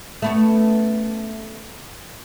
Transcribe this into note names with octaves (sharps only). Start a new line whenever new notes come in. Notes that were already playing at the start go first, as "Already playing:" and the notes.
A3 B3 C#4